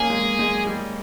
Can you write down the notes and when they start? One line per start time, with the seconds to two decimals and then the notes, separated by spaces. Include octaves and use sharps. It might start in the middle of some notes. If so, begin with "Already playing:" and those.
Already playing: A#3 C#4 D#4 G#4
0.10 G#3
0.39 G#3
0.67 G3